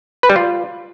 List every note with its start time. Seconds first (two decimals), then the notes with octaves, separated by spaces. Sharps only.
0.23 B4
0.30 G3
0.36 F4